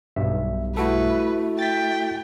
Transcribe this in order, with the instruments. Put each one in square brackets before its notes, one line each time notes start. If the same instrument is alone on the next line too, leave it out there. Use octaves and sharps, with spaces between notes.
[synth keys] B1 G2 [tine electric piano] E5
[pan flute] A3 [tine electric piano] E4 F#4 A4 [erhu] B4
[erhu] G5 [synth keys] A6 B6